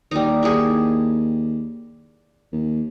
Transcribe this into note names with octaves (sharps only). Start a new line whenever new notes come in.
D#2 G3 D#4
E4 G4 G#4
D#2